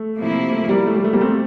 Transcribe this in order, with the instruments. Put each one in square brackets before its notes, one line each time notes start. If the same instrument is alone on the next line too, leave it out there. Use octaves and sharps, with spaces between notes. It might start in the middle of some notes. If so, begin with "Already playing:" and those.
Already playing: [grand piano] A3
[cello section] C3 F3 A#3 E4
[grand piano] A3
G3 A#3
A3
G3
A3
G3 A#3
A3 C4